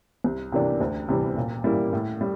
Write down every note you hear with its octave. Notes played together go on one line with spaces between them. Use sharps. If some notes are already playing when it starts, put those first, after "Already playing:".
C2
C3 E3 A#3 D4
D2
C3 E3 G3
A#2
G3 A#3 E4
A2
G3